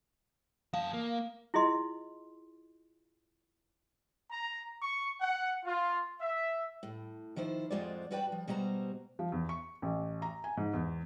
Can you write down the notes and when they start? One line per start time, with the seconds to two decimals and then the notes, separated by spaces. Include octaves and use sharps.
0.73 F#2 F5 A5
0.94 A#3
1.54 E4 F4 G#4 D#5 C6
4.31 A#5
4.82 C#6
5.21 F#5
5.65 F4
6.21 E5
6.83 A2
7.36 D#3 F3 E4 C5
7.70 F2 G#3 F4 F#4 C5 D5
8.11 G2 F#4 B4 D5 G5 A5
8.32 F3
8.48 B2 G3 G#3 F#4 C5 A#5
9.19 F3
9.32 E2
9.49 C#6
9.82 A1
10.22 A#5
10.44 G#5
10.57 G#2
10.74 E2